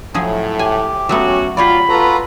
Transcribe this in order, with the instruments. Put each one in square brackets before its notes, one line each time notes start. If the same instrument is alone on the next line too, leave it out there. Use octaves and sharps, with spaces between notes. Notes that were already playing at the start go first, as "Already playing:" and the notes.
[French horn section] A2 [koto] F3 F#3 G#4
[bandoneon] G4 [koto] G#5
[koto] F#3 A3 B3 [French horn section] C#4 F#4
[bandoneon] F#3 [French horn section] F4 [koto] G4 C#5 D5 [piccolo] B5
[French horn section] F4 B4 [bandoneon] F#4 A4 A#5